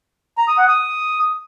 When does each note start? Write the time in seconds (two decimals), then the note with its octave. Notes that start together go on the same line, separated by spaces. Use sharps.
0.38 A#5
0.48 D#6
0.58 F#5
0.68 D#6